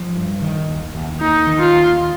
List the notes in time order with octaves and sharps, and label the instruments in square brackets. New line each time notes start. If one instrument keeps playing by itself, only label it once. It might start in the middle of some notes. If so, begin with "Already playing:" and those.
Already playing: [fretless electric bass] F3
G2
D#3
D#2
D#2
[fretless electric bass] A#3 [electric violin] D#4
[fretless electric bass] D#3
[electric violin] F4
[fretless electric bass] D#2